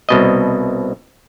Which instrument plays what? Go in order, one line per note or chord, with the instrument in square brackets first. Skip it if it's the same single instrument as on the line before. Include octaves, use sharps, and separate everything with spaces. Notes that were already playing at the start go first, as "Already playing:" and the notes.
[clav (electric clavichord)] C2 B2 D#5